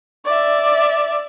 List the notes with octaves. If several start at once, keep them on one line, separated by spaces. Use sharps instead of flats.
D5 E5